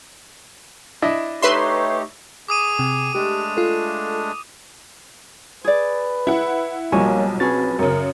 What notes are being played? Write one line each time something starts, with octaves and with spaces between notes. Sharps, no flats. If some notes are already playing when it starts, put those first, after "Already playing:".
D4 E4 D#5
A3 D#4 G4 B4 C#5 E5 C6
G#4 D6 D#6 D#7
C3
G#3 A3 D4 G4
F4 A4
G#4 B4 D5
E4 F#5
B1 F3 G3 A#3 F#4 C#5 D#5 G#5
C4 C#4 F#4 G#4 B4 A6
F#2 C#3 A#4